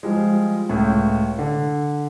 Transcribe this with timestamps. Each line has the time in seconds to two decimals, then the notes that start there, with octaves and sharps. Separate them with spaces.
0.03 F3 G3 G#3
0.70 C#2 A2
1.39 D3